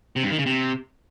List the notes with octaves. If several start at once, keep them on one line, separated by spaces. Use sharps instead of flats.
C3
G2
D#3
C#3
C3